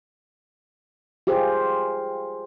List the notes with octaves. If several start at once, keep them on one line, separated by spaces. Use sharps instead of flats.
F4 G4 G#4 C5